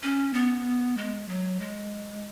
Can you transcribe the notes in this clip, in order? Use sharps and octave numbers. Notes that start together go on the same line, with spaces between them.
C#4
B3
G#3
F#3
G#3